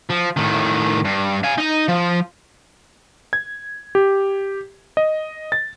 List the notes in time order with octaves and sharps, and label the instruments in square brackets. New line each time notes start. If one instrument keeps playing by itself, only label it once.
[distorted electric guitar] F3
A2 D#3
G2
F5 G#5
D#4 D#5
F3
[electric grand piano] G#6
G4
D#5
A6